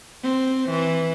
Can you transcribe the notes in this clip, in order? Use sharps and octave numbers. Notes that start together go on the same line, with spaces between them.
C4
E3